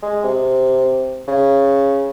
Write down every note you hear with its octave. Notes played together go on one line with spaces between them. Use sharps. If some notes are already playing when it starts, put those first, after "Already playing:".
G#3
C3
C#3